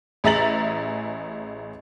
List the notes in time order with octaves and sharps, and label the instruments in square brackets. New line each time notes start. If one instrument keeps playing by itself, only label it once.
[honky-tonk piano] A1 G#4 E5 A#5 A6 F#7